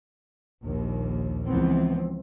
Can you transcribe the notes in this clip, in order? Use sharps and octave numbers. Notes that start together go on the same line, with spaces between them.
A#1 D#2
C#2 E3 F3 B3 C4